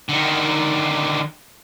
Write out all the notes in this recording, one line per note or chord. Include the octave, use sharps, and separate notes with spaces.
D3 D#3